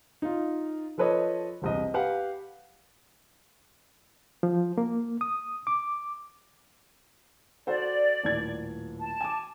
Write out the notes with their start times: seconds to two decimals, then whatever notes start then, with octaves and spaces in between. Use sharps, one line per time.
0.22 D#4 F4
0.98 F3 A4 B4 C#5 D#5
1.62 E1 C2 D#5
1.94 G4 B4 F5 F#5
4.43 F3
4.78 A#3
5.21 D#6
5.67 D6
7.67 F#4 A4 C5 D5
8.24 D#1 A2 G#6
8.99 A5
9.21 G#5 D6